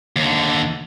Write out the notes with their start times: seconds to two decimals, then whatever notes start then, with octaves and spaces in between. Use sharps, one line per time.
0.16 D#2 D3